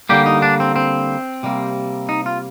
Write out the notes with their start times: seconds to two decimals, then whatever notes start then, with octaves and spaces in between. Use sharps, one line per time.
0.09 D3 G3 A#3 G4
0.26 D#4
0.42 D4
0.60 C4
0.76 C4
1.43 C3 G3 A#3
2.09 D#4
2.26 F4